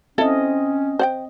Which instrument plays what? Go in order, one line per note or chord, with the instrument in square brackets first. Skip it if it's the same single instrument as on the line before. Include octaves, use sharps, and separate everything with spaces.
[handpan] C4 D#5 [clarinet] C#4 [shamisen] E4 A4 F5
[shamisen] C5 F#5 G5